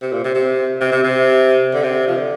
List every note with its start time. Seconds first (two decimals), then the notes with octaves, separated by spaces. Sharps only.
0.01 C3
0.13 A#2
0.24 C3
0.35 C3
0.81 C3
0.92 C3
1.04 C3
1.74 D3
1.83 C3
2.07 F3
2.17 D3